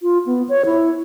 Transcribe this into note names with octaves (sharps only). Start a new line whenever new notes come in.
F4
B3
C#5
E4